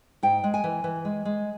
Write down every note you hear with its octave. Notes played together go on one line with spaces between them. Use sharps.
G#2 G5
G#3
G#5
E3
E3
G#3
G#3